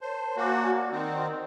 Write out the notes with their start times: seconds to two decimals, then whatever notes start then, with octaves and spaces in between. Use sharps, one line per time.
0.01 A#4 C5 C#5 A5
0.37 A#3 F#4 G#5 D6
0.58 D5 F#5
0.92 D#3 C4